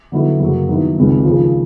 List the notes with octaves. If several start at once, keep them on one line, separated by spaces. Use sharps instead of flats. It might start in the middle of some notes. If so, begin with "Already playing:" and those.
D3 F#3 B3 E4
F#2 C#3 F#3 A#3
G2 D#3 F#3 B3 E4
C#2 C3 D#3
D#2 C#3 F3